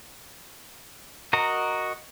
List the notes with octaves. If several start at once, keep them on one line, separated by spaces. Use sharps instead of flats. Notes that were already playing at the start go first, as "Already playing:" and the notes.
F#4 A#4 D#5 A#5